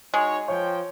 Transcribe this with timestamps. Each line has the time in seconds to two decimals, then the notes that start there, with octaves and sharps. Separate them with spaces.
0.14 G#3 D#4 F#4 C#5
0.48 F3 C#5 G5